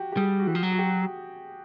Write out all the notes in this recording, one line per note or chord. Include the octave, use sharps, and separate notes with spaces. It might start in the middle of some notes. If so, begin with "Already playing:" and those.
Already playing: F#4 G4
G4
G3 G#4
F#4
E3 G4
F3
F#3
F#4
G4